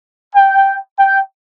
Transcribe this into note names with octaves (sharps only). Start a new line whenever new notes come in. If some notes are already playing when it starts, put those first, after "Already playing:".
G5
G5